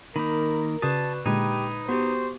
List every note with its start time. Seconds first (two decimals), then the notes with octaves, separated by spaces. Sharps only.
0.16 D#3 A#3 D#4 A#4 B5
0.82 C#3 F#4 B4 D5 A5 D#6
1.26 A#2 D3 G#3 D#4 G4 B4 G#6
1.88 B3 F#4 G4 C5